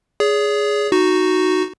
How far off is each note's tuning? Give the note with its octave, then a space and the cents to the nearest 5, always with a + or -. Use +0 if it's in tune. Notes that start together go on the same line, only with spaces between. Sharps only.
G#4 +0 C#5 +45
D#4 +0 F#4 +0